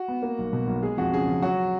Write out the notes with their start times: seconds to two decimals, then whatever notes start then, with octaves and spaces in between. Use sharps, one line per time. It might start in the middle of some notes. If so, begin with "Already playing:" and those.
Already playing: F#4
0.08 B3
0.22 A#3
0.38 B1
0.53 B2
0.67 B1
0.83 G#3 G#4
0.97 F2 F#4
1.13 C#3 G#4
1.28 F2
1.42 F#3 F#4